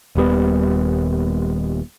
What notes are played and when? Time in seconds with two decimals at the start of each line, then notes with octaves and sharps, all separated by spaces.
0.15 D#1 D#2 G3 B3